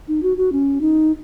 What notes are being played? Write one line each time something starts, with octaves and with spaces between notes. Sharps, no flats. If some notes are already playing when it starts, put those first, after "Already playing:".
D#4
F#4
F#4
C#4
D#4